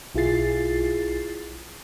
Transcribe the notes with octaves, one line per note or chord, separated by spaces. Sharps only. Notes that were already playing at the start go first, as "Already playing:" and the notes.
B1 E4 F4 G#4 A6 C7